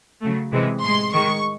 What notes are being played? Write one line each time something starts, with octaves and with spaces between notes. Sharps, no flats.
C#3 F#3 A3
C3 E3 G#3
A2 G#3 C6
D#3 G#3 C#6